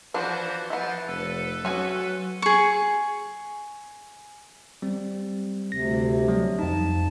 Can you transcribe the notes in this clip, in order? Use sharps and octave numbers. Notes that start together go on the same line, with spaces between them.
E3 F3 B3 D4 F#4 C5
F3 B3 E5 A6
F1 A4 B4
F#3 C#4 F#4 G#4
G#4 C#6
G3 C4
D2 C3 A#6
F#3 G3
F2 D#4 A5